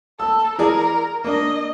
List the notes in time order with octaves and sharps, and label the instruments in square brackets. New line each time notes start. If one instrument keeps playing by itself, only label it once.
[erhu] A4 [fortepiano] E6
[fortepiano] E3 G#4 D5 [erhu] A#4
[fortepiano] A#3 D4 [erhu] D#5